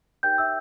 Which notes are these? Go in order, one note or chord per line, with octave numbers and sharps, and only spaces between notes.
D#4 G4 A#4 C#5 G5 G6
E5 E6